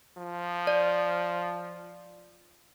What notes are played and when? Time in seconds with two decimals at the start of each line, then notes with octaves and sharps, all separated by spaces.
0.17 F3
0.67 D5